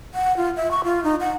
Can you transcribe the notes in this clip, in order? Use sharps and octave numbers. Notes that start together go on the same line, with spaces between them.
F#5
F4
E5
C#6
F4
D#4
F#5